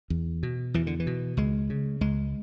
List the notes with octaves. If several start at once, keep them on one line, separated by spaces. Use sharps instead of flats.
E2
B2
E2 E3
D3
E3
B2
C#2 G#3
C#3
C#2 G#3